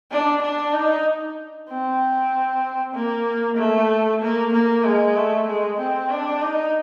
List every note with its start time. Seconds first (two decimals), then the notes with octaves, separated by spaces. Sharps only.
0.11 D4
0.42 D4
0.73 D#4
1.69 C4
2.94 A#3
3.57 A3
4.22 A#3
4.53 A#3
4.84 G#3
5.16 A3
5.47 G#3
5.79 C4
6.11 D4
6.41 D#4